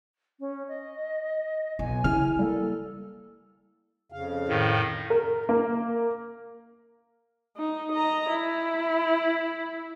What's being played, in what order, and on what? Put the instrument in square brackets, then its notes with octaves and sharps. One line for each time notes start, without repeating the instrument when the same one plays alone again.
[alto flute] C#4
D#5
[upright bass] B1 [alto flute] G#5
[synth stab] A#1 C#3 F6 [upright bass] E4
[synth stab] G3 A#3 [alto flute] A4
[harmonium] F2 C#3 F5
[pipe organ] A2 D#3
[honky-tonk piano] A#4
A#3
[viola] D#4
D#5 A#5
E4